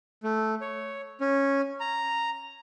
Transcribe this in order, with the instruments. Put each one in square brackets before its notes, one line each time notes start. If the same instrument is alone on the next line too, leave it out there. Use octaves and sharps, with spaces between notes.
[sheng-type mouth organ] A3
C#5
C#4
A#5